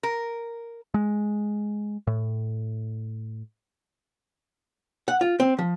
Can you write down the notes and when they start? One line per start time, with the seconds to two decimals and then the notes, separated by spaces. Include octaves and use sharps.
0.03 A#4
0.94 G#3
2.07 A2
5.08 F#5
5.21 F4
5.40 C4
5.59 F3